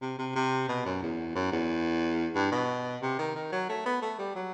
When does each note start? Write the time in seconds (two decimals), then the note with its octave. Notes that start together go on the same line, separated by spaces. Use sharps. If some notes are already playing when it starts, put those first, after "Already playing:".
0.02 C3
0.18 C3
0.35 C3
0.69 B2
0.85 F#2
1.02 E2
1.35 F#2
1.52 E2
2.35 G2
2.52 B2
3.02 C3
3.19 D#3
3.35 D#3
3.52 F#3
3.69 A3
3.86 B3
4.02 A3
4.19 G3
4.36 F#3